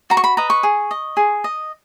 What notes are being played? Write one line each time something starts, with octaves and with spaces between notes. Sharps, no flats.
F#4 A#5
C#6
B5
B4 D#5 A#5
C#6
G#4
D#5
G#4
D#5